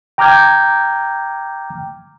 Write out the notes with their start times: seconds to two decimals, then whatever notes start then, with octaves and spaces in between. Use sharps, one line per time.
0.18 G5 A#5 D6 F6 G6 G#6